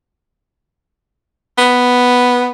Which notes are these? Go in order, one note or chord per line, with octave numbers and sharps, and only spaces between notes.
B3